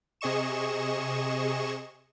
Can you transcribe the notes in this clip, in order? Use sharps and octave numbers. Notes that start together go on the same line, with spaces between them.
C3 G#4 D#5 C#6 E7